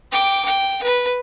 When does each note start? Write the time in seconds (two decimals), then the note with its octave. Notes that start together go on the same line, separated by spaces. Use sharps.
0.12 G5 D6
0.45 G5
0.83 B4